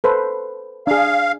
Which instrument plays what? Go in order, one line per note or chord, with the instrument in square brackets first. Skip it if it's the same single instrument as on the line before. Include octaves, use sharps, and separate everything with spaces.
[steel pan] A4 B4 C5
[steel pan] D4 G#4 [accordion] F5